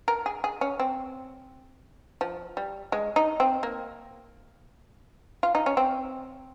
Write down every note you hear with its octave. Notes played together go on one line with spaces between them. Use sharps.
A#4
G#4
G#4
C#4
C4
F3
G3
G#3
D#4
C4
A#3
F4
D#4
C#4
C4